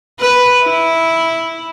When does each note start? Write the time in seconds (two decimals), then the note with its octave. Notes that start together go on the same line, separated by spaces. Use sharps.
0.20 B4
0.64 E4